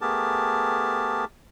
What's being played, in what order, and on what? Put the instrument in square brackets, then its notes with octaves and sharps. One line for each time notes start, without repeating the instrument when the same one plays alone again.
[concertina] A3 B3 G4 G#4 A#4 A5